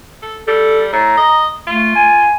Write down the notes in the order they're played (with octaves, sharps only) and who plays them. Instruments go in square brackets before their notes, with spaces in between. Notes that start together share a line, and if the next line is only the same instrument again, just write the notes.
[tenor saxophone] A4
[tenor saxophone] G3 [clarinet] A4
[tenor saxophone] A2 [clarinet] A#5
[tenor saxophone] D#5
[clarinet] A3 [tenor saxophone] F4
[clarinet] G#5